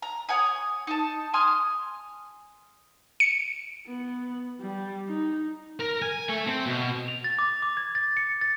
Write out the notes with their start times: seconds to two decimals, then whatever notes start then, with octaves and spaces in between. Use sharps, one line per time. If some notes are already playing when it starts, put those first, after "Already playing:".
0.02 A#5
0.29 C#5 F#5 G#5 D#6
0.87 D#4 A5
1.34 G#5 C6 D#6 F6
3.20 C#7
3.87 B3
4.60 G3
5.08 D#4
5.80 A#4
6.02 G#5
6.29 A3
6.47 C4
6.66 B2
7.08 F7
7.24 A6
7.39 D6
7.62 D6
7.77 G#6
7.95 A6
8.17 C#7
8.41 A6